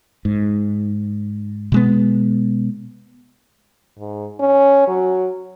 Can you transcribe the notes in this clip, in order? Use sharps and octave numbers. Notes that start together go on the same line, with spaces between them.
G#2
B2 G#3 B3
G#2
C#4
F#3